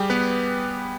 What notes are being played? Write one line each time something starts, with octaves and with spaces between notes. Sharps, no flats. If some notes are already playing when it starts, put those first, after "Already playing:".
Already playing: G3 G4 G#4
B3 B4